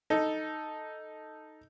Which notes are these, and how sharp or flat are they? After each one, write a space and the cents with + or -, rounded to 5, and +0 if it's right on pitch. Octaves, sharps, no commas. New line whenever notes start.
D#4 +0 A4 +0